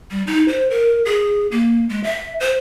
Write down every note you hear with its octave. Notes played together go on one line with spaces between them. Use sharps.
G3
D#4
C5
A#4
G#4
A#3
G#3
E5
C5